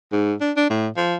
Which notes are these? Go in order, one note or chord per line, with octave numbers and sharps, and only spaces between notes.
G#2
D4
D4
A2
F3